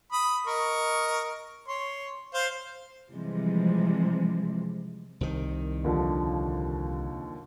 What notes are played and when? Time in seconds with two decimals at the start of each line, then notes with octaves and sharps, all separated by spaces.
0.12 B5 D#6
0.47 A#4 D#5 C#6
1.68 C#5 C6
2.34 C5 F5
3.11 C3 E3 F3 G3 G#3
5.21 C2 C3 D#3
5.84 D#2 D3 F3